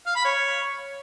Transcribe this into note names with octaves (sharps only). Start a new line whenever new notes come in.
F5
B5
C#5